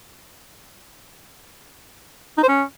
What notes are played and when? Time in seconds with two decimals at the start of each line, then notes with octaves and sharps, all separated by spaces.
2.38 D#4
2.43 C5
2.48 C#4